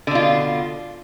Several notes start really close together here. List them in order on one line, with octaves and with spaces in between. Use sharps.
D3 B2 F4